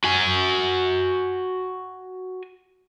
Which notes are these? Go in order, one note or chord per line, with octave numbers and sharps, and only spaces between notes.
F#4 G#5